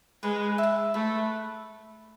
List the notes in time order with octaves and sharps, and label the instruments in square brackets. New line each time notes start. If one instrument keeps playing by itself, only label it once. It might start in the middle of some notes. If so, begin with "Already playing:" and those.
[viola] G#3 [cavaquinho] B4
[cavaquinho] E5
A5
[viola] A3 [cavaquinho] B4